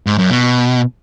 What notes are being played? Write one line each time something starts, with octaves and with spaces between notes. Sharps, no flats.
G#2
F#2
B2